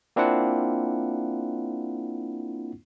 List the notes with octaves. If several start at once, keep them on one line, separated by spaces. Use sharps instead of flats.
A#3 C4 D4 E4 F4 F#5